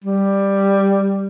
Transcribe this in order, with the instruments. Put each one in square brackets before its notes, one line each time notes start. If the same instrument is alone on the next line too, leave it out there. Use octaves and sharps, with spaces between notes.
[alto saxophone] G3